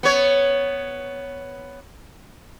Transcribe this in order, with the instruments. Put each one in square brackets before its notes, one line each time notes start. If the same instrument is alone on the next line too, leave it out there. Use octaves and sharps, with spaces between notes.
[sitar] B3 C#5